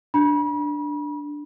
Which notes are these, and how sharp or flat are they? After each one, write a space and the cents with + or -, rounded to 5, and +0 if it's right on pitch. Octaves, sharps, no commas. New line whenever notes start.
D4 +5 B5 -40